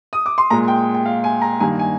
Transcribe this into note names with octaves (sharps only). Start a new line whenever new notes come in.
D#6
D6
C6
A#2 G#3 A#5
G5
G5
F5
G#5
A#5
G2 D#3 G3 A#3 G#5
G#5